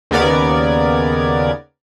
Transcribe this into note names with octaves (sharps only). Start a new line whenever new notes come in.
D#2 C#3 B3 A#4 D5 G#6